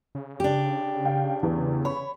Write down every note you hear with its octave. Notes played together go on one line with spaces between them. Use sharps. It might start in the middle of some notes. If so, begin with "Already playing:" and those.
C#3
D4 G4
F5 G5
E2
C#5 B5